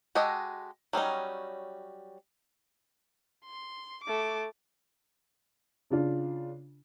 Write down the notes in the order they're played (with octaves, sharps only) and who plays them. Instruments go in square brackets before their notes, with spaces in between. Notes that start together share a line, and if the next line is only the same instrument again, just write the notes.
[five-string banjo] G#3 F#4 G4 A4 D#5
F#3 G3 C#4 D#4
[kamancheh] C6
A3 D6
[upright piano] C#3 D4 F4